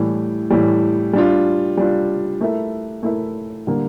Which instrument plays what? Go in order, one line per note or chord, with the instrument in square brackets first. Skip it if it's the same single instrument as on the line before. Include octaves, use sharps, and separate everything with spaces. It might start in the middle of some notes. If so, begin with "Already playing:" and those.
Already playing: [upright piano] A2 E3 G3
A2 E3 G3
G3 D4 F4
G3 D4 F4
A3 E4 A#4 E5
A3 E4 A#4 E5
D3 G3 A#3